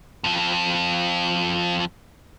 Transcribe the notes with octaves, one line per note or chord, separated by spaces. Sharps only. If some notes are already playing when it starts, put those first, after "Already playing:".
F2 F3